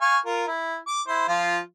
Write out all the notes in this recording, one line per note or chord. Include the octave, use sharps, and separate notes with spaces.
F5 G#5 C#6
F4 A#4
E4
D6
E4 C5
F3 F4